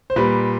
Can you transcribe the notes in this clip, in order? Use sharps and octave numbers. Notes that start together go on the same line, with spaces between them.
C5
A#2 G3 B4